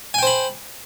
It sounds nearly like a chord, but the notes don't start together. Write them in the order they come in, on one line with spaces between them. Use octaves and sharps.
G#5 G5 C5 B5